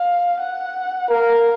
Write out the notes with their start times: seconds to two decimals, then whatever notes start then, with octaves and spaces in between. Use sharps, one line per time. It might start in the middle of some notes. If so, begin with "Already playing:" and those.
Already playing: F5
0.40 F#5
1.09 A#4 F5